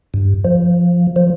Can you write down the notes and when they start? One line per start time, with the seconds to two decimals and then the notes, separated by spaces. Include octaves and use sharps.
0.14 G2
0.45 F3
1.16 F3